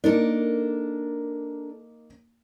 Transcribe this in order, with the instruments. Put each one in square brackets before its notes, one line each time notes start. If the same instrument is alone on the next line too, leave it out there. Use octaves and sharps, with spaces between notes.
[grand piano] A#3 D#4 [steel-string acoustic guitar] D4 A4 A#4